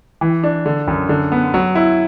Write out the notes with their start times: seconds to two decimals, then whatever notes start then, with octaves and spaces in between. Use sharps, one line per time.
0.21 E3
0.43 D4
0.66 D3
0.88 F#2
1.09 D3
1.32 B3
1.54 F#3
1.75 E4